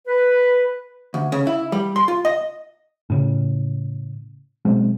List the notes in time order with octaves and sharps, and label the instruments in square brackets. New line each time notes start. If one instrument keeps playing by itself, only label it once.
[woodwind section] B4
[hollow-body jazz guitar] D2
C#3
E4
G3
C6
F4
D#5
[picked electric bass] A2 C#3
B2 F#3 G#3 C4